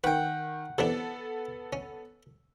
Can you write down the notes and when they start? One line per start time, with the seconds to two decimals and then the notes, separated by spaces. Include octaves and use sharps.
0.04 D#3 B4 F#5 G5
0.78 C3 E3 B3 D4 A4
1.73 C#4